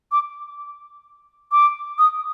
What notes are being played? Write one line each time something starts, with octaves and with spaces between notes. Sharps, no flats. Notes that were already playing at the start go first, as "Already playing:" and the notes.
D6
D6
D#6